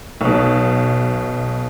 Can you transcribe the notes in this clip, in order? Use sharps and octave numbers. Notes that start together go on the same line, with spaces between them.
B1 B2